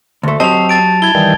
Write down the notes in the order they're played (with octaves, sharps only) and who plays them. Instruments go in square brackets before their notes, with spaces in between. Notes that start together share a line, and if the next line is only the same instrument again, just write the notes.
[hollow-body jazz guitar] D2 A3
[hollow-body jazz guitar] F#3 G4 D#5 [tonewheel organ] C4 [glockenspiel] A5 F7
[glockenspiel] A5 A6 D7
[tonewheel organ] E4 [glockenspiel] G#6 G7
[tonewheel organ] D#3 E3 G3